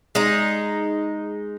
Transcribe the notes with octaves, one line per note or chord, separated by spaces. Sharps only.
G#3 D#4